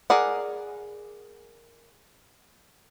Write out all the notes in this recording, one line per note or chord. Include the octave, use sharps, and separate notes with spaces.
G#4 A#4 D5 F#5